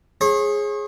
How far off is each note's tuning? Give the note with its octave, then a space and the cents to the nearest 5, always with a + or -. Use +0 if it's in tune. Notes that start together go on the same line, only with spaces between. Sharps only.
G#4 +0 C#5 -40